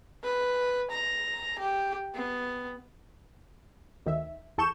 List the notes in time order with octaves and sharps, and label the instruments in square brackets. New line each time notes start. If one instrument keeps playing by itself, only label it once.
[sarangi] B4
A#5
G4
B3
[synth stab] D2 D#3 E5
E2 A4 C#6 G6 E7